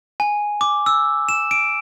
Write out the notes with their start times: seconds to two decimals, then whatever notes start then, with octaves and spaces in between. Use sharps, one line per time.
0.20 G#5
0.61 D6
0.86 E6
1.29 E7
1.51 D7